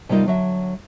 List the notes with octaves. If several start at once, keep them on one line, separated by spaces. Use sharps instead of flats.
C3 G3 A#3 D#4 F4 C5
D3 F#3 E5